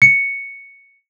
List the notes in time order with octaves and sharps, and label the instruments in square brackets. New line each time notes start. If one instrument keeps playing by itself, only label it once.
[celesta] C#7